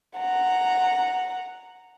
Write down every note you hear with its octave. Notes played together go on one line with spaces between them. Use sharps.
F#5 A#5